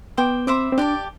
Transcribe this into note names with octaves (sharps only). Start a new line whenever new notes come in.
B3 C5 G5 D6
C4 C5 E5 B5 D6
C4
D4 G4 D5 A5